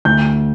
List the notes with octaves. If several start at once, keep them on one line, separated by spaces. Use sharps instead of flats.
D2 G6